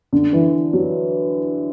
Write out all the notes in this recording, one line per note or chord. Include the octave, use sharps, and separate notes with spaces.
D3
E3
F#3